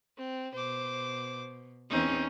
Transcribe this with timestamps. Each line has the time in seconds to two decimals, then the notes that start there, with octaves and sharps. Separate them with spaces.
0.18 C4
0.55 B2 C5 D6
1.90 E2 C4 C#4 D#4